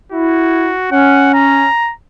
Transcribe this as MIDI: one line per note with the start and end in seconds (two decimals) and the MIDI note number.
0.13 0.72 64
0.13 0.90 66
0.92 1.66 61
0.92 1.32 78
1.34 1.92 82